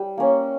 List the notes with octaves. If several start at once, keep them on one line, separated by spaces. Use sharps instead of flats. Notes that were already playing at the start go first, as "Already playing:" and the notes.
Already playing: G3
A#3 C#4